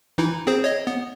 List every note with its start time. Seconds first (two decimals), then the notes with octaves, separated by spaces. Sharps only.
0.18 E3 D#4 E4
0.47 C4 G#4 C5
0.64 C#5 D#5
0.87 B3